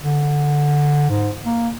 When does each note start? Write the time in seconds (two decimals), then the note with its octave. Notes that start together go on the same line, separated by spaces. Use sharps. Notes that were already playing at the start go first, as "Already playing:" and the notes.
0.03 D3
1.10 G#2
1.46 A#3